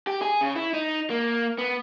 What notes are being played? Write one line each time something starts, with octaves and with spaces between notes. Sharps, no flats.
G4
G#4
C#3
E4
D#4
A#3
B3